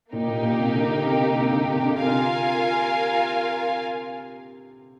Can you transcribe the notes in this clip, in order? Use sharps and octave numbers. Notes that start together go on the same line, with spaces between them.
A#2 A#3 D#4 G4
A#2
A#2
C3
D3
D3
C3
C3
C3
D3
C3
D3
C3 F4 A#4 F5 G#5